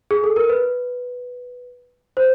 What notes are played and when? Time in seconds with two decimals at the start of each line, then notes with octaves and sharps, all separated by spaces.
0.11 G#4
0.24 A4
0.36 A#4
0.49 B4
2.17 C5